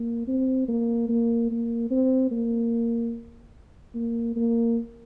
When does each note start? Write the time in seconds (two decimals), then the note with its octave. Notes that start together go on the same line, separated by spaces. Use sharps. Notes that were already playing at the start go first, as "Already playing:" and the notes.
Already playing: A#3
0.27 C4
0.68 A#3
1.09 A#3
1.51 A#3
1.90 C4
2.31 A#3
3.94 A#3
4.36 A#3